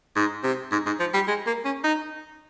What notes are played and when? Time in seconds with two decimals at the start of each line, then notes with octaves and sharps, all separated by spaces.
0.16 G#2
0.44 C3
0.72 G#2
0.86 G#2
1.00 F3
1.14 G3
1.28 G#3
1.47 A#3
1.65 C#4
1.84 D#4